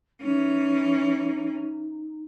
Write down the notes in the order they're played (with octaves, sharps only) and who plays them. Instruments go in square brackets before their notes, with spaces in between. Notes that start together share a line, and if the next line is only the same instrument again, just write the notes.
[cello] E3 C#4 [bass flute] D#4